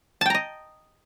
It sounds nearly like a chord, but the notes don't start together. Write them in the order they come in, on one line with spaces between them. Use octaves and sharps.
A5 G5 A#5 D#5